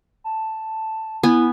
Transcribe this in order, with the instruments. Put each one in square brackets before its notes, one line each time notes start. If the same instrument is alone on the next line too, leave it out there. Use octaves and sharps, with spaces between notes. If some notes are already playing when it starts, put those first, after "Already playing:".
[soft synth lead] A5
[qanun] B3 G#5 [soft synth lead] E4